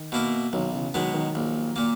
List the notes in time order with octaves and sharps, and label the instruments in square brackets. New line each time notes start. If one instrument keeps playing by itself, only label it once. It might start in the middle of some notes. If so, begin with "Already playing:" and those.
Already playing: [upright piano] D#3
[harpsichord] B2 A#3 E4 A#4
[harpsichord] B1 [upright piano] D#3 F#3
[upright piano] C#3 E3
[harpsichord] B2 G#3 B3 [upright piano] D#3 F#3
[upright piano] D#3 F#3
[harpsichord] A#1
A#2 A#3